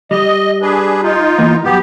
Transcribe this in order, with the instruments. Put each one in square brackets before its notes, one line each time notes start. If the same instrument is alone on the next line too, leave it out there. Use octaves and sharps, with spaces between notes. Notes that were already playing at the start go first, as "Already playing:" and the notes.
[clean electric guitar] G3 [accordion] D#5
[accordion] D4 G#4 B4
D#4 F4
[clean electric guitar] E3 A#3 B3
[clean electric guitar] G2 F#3 [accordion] B3 G4